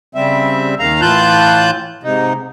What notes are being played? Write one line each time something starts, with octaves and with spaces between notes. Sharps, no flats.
C#3 G3 C4 E5
D#2 D#3 F5 A#5
A2 E3 F4 A5 F#6 G6
G#2 C3 D#4